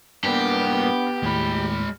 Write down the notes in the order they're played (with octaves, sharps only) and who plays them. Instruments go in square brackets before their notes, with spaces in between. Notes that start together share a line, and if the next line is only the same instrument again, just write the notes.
[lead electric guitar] G2 A#3 [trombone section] B3 [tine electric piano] D4 B4 G5 [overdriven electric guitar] G4
[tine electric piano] D#2 A2 [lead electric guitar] G#3 B5